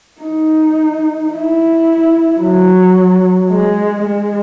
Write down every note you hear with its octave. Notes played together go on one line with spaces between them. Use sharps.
D#4
E4
F#3
G#3
G#3